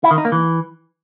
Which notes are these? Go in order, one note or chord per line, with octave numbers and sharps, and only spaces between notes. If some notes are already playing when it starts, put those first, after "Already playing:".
E4
D#3
D#4
A#3
E3